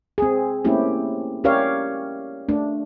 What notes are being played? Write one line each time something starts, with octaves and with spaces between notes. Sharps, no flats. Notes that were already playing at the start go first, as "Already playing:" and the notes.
C4 G#4
A3 A#3 C4 C#4 E4 G4
C#4 G4 A#4 C#5 D5 F5
A3 D4